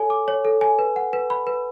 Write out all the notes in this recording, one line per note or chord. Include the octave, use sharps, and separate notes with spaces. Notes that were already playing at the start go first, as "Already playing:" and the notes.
Already playing: A4 C#5 G#5
D6
C#5
A4
G#5
B4
F#5
B4
B5
B4